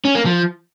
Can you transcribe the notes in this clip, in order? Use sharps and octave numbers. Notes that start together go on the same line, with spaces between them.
C#4
A#3
F3